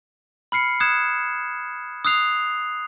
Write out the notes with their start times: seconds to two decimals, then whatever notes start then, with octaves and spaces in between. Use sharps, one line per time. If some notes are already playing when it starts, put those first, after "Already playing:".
0.52 B5 F6 C7 C#7
0.80 D#6 F#6 G#6 C#7 E7
2.05 D#6 E6 F#6 C7 F7